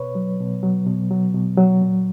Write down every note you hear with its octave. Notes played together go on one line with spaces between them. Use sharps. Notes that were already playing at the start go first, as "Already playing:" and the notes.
Already playing: B2 B4 C#5
F#3
B2
F#3
B2
F#3
B2
F#3
A#2